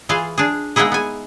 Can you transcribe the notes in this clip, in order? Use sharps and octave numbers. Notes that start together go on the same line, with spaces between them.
E3 F4 G#4 F5
D4 G#4
G#3 A#3 B3 D#4 E4 G#4
B3 G#5